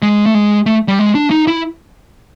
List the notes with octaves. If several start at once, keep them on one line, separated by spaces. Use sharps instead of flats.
G#3
A3
G#3
A3
G3
G#3
D4
D#4
E4